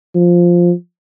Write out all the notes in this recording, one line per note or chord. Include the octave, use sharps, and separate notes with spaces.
F3